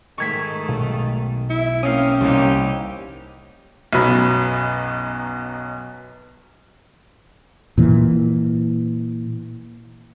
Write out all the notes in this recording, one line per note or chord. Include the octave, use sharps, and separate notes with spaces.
G#2 D#3 A3 C#6 G#6 B6
B1
E4
A#3 C4 C#4 F5 D#6
C2 A#3 D#4 G4
B1 F#2 B2 F#3 B5
A#2 E3